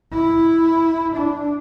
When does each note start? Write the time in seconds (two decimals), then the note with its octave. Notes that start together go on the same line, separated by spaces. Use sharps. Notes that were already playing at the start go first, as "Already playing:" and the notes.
0.13 E4
1.17 D4